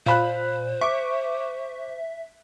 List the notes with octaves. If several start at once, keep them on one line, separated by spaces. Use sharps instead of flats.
A#2 C5 F5 B5 F#6
E5 C#6 D6